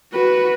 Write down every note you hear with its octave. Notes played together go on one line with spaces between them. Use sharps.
F#4 B4